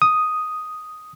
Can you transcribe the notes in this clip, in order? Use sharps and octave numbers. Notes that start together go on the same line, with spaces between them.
D#6